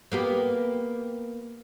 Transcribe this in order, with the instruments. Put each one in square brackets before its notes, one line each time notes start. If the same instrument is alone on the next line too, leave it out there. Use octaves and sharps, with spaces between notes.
[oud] A#3 B3 G4